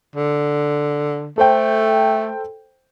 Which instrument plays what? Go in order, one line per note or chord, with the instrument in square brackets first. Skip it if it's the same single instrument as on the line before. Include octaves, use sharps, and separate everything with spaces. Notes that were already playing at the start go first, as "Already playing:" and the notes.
[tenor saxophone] D3
[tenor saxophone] A3 [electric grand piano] A4 C5 G5